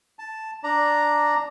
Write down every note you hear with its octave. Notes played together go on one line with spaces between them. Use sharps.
A5
D4 D5 A#5